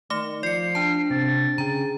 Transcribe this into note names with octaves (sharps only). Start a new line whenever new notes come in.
D#3 A3 D6
F3 D5 C7 C#7
D4 A5
C3 C4 A6
C#3 G#4 G5 A#5